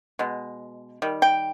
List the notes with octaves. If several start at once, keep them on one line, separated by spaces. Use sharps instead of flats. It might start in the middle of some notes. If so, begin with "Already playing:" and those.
B2 G#3
D#3 G3
G5